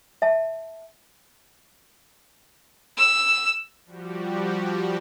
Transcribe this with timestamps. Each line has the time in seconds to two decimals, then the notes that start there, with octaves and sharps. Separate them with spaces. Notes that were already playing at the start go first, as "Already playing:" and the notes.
0.22 E5 A5
2.97 E6
3.85 F3 G3 F#4 G4